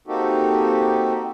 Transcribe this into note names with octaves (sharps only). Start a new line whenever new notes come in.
A#3 C4 D#4 F#4 G4 A4